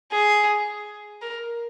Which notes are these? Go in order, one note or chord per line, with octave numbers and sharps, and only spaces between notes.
G#4
A#4